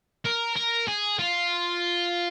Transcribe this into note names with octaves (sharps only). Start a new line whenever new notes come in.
A#4
A#4
G#4
F4